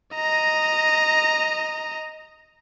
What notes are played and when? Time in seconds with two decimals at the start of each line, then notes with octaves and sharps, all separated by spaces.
0.14 D#5 A#5